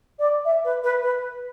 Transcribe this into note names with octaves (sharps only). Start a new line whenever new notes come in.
D5
E5
B4
B4
B4